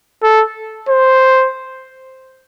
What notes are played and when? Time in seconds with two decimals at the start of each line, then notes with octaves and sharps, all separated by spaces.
0.23 A4
0.89 C5